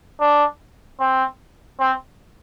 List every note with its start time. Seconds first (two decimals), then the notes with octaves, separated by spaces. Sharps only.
0.20 D4
1.00 C4
1.80 C4